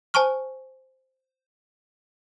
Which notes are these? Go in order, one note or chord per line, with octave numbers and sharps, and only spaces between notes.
C5 G#5 A5 C#6 F6